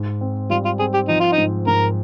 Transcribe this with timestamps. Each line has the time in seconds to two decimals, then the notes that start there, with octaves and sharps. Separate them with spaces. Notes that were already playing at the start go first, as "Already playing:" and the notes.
Already playing: G#2
0.21 C4
0.50 G3 F4
0.65 F4
0.79 C4 G#4
0.94 G4
1.08 F3 D#4
1.20 F4
1.32 D#4
1.38 G#2
1.67 G#2 A#4